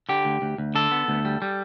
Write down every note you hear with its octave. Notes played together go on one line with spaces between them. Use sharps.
D3 G4
D2
D2
D2
D3 A4
B3
D2
G3
G3